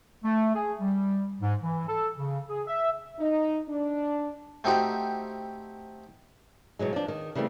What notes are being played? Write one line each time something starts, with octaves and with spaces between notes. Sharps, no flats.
A3
G#4
G3
G#2
E3
A4
C#3
G#4
E5
D#4
D4
A3 C4 D#4 F#4 G4
B2 E3 F#3 G#3
F3 D4
D#3
C#3 E3 G3 A3 C4